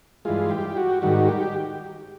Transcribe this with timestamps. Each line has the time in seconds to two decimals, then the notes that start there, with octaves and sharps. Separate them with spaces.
0.25 G2 E3 G#3 F4
0.51 G4
0.77 F#4
1.02 G#2 D#3 G3 F#4
1.28 G4